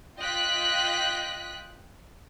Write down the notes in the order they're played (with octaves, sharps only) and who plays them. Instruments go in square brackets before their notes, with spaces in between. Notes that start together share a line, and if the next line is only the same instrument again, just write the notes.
[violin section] F4 D#5 G5 F#6 B6